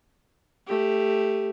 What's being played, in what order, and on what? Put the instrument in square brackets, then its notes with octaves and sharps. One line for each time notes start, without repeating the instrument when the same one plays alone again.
[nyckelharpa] A3 G4